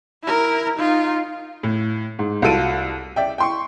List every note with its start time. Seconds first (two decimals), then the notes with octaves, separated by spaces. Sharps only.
0.23 E4 A#4
0.77 D#4 F4
1.63 A2
2.19 G#2
2.42 C2 F4 F#4 A4 D7 D#7
3.16 D5 E5 G5
3.38 G5 C6 C#6